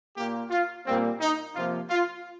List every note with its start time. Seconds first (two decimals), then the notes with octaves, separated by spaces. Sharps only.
0.16 A#2 A#3 G4
0.50 F4
0.85 A#2 G3 A#3 C4
1.20 D#4
1.55 C3 F3 A#3 F4
1.89 F4